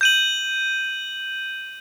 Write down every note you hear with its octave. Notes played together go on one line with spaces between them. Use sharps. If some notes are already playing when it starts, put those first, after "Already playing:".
G6 D#7 F#7